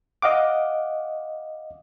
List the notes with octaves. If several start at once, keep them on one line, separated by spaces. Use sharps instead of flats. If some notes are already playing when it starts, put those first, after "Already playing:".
D#5 F5 F#5 D6